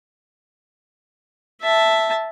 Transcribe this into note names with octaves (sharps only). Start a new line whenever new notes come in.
E5 A5